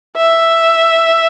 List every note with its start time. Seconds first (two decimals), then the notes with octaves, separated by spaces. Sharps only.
0.16 E5